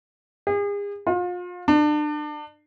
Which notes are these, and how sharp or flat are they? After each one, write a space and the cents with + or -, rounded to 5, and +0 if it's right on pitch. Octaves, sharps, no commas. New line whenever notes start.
G#4 -40
F4 +35
D4 +35